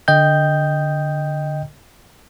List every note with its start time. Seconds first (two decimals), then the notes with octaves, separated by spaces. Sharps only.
0.08 D3 D#5 G5 G6